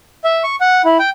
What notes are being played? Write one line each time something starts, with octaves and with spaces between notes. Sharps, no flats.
E5
C#6
F#5
E4
G5